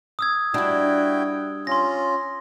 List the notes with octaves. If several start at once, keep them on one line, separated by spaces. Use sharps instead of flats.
D#6 E6 G#6
G3 D4 E4 F#4 G5
C#4 F4 C6 A#6